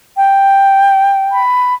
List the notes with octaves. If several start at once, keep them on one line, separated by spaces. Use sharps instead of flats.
G5
B5